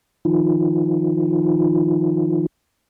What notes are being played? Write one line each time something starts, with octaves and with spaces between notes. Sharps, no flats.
D#3 F3